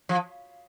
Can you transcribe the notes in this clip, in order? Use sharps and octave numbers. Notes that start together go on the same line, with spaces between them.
F3